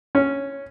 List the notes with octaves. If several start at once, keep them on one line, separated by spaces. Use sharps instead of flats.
C#4